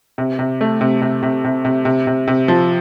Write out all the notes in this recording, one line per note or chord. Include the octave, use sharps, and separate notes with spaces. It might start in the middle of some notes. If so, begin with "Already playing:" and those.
C3
C3
A3
C3
C3
C3
C3
C3
C3
C3
C3
F3